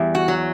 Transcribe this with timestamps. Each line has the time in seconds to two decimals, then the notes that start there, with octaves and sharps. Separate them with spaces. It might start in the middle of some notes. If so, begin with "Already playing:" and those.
Already playing: E2 G3
0.15 F#4
0.28 F#3